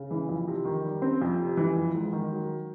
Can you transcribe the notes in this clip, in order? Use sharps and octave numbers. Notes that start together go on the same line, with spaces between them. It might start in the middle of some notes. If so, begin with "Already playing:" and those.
Already playing: C#3
E3
F2
C3
D#3
G3
C4
F2
C3
E3
F2
G#2
D#3
F#3